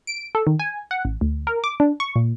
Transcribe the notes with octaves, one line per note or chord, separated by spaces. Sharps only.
D7
A4
D#3
G#5
F#5
A1
D2
A#4
D6
D4
C#6
A#2